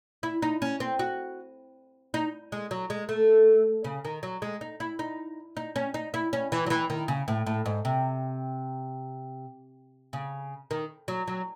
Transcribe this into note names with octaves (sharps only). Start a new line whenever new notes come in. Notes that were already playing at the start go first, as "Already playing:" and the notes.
E4
D#4
C#4
C4
F#4
D#4
G#3
F#3
G#3
A3
C#3
D#3
F#3
G#3
D#4
E4
D#4
D#4
C#4
D#4
E4
C#4
E3
F#3
E3
D#3
C#3
A2
A2
G#2
C3
C#3
D#3
F#3
F#3